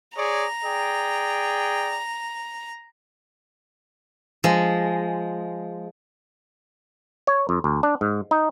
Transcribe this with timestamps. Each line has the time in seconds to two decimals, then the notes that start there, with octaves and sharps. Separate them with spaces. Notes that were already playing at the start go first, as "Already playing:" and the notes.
0.17 G#4 C#5 D5 A#5
0.65 G#4 D5 G5
4.44 F3 G#3
7.27 C#5
7.49 F2
7.64 D2
7.83 D4
8.01 G#2
8.31 D#4